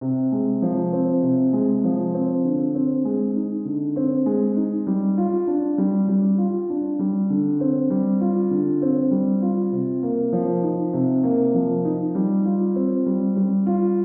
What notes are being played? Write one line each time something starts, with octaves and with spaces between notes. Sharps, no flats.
C3
G#3
F3
C4
C3
G#3
F3
C4
D3
C4
G#3
D#4
D3
C4
G#3
D#4
G3
F4
D4
G3
G3
F4
D4
G3
D3
C4
G3
F4
D3
C4
G3
F4
C3
A#3
F3
D#4
C3
A#3
F3
D#4
G3
F4
C4
G3
G3
F4